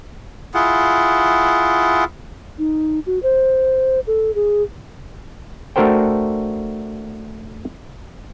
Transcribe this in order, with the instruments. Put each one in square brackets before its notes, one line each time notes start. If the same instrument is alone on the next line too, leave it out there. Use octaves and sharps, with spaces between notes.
[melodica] E4 F4 G#4 F#5
[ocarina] D#4
F#4
C5
A4
G#4
[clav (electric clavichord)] A3 D4 F#4 A#4 C5 G5